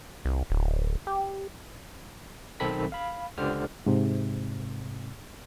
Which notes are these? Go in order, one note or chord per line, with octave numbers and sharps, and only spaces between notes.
C2
D1
G4
B1 D#3 C4 A4 B5 B6
F5 B5
C#2 D3 G4 C5 F6
G#2 C3